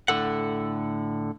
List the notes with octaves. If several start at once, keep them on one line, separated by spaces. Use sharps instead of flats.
A2 D3 A4 F#5